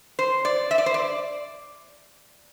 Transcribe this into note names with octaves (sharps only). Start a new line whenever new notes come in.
C5
D5
E5
D5
C5
D5